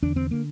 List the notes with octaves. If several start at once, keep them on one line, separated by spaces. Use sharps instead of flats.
E2 D3 D4
C4
D3 A#3